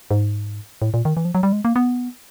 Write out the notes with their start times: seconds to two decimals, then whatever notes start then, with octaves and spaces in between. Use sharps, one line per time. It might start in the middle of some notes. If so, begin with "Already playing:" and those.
0.11 G#2
0.82 A2
0.94 A#2
1.05 D#3
1.17 E3
1.25 F3
1.35 F#3
1.43 G3
1.52 G#3
1.65 A#3
1.76 B3